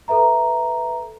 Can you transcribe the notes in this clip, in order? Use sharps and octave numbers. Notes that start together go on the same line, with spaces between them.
A4 B4 E5 A#5